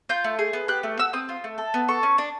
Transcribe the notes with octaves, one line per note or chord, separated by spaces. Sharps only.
F4 G6
A3
G#4
B3
G4 F#6
A3
F#4 E6
C4 D#6
F4
A3
A4
B3
A4 C#6
C#4
D4